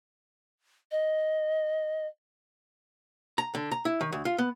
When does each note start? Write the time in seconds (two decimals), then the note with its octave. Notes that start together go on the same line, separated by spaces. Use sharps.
0.91 D#5
3.38 A#5
3.55 D3
3.71 A#5
3.85 E4
4.01 D#3
4.12 D2
4.25 F4
4.38 B3